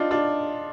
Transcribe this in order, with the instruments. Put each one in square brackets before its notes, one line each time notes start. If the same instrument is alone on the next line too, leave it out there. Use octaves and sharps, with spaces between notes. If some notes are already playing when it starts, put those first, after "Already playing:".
Already playing: [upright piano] D4 D#4 F4
D4 F4